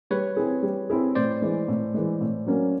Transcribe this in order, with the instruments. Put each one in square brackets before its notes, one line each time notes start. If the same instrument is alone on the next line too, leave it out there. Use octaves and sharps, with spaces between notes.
[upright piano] G3 [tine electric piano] B4 C#5
[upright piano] C4 E4 G#4
G3
C4 E4 G#4
[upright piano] A2 [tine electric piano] C5 D5
[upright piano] E3 G#3
A2
E3 G#3
A2
F#3 A#3 C#4